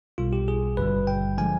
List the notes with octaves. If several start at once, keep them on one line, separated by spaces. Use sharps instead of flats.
B1 B2 G3 F4
G4
G#4
G#1 G2 D3 G3 B4
G5
D3 F3 G#3 G#5